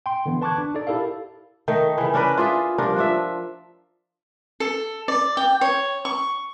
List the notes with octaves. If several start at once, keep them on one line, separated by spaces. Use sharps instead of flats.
G5 C6
D3 E3 B3
B4 A5 C#6 D6 F#6 G#6
D4
D#4 A4 D5
E4 G4 A4 A#4 F5
D#3 A3 D#4
C#3 E3
C#4 D4 A#4 B4
F4 G#4 D5 E5
G2 F3 D4 A#4
F3 D4 E5
A4
D5
G5
C#5
C#6